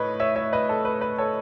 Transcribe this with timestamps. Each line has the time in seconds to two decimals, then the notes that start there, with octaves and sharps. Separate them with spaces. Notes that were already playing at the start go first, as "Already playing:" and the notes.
Already playing: A2 B4 C#5 D#5
0.20 C#5 E5
0.36 C#5 E5
0.53 B4 D#5
0.69 A4
0.85 B4
1.01 B4
1.18 A4 C#5